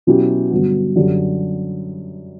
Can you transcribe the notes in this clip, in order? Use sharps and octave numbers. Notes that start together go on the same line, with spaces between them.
B2 F#3 C#4 E4 G4
G2 D3 F#3 B3
F#2 D3 G3